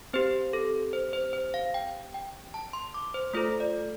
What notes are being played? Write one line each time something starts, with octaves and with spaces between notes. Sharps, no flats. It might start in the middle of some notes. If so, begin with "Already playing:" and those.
C4 G4 C5
A4
C5
C5
C5
F5
G5
G5
A5
C6
D6
C5
A3 F4 A4 C5
D5